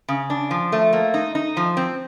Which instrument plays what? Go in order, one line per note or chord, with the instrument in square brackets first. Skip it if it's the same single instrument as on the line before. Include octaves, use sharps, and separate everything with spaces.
[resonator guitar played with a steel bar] C#3
D4
F3
A3
A#3
D#4
D#4
F3
C4